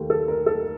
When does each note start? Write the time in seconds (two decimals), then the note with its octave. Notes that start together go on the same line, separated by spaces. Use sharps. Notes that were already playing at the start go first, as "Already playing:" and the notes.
Already playing: D#2 D#3 A3 G4
0.10 A4
0.28 A#4
0.46 A4